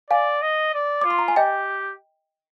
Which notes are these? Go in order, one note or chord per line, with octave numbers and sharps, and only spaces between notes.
D5 F5 G#5
D#5
D5
F4 D6
C6
A#5
G#5
G4 D#5 G5